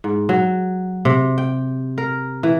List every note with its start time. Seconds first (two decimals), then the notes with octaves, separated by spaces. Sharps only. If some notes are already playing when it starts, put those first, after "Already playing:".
0.04 G#2
0.29 F#3
1.05 C3
1.38 G5
1.98 A#4
2.43 E3